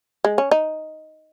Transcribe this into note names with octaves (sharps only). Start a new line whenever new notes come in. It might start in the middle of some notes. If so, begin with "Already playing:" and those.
G#3
C#4
D#4